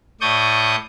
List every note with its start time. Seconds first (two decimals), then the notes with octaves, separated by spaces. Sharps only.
0.21 A2 D5 C#6 D#6 G6